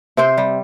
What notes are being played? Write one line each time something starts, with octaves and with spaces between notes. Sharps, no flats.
C3 C4 C5
G3